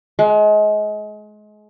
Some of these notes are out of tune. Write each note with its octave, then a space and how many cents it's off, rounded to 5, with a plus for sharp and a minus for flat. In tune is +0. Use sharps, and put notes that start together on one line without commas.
G#3 +30